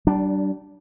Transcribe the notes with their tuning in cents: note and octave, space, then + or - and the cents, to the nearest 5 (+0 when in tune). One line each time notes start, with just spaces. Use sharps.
G3 -35 D4 +0